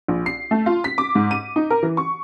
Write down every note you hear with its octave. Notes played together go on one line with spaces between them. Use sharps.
A#1
C7
A3
F4
B6
D6
G#2
D#7
D#4
A#4
E3
C#6